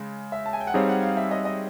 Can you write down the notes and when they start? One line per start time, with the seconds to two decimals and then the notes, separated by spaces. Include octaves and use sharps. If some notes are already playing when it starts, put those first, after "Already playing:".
Already playing: C#3 G#3
0.32 E5
0.46 A5
0.53 G#5
0.61 G5
0.67 F#5
0.74 G3 C4 D#4 G#4 C#5 F5
0.89 F#5
1.03 F5
1.17 E5
1.31 D#5
1.45 D#5